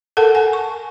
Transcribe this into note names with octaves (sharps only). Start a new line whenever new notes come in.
A4 A#4 F#5 A5
F#5 G#5
C#6